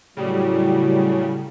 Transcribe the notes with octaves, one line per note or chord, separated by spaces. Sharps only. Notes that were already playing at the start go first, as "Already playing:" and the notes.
A2 C#3 F#3 G3